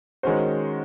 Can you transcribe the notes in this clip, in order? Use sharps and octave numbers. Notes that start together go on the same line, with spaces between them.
D#3 G#3 C#4 F#4 C5